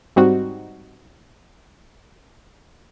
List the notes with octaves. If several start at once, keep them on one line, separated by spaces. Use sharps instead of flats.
G#2 G3 C4 D#4 F#4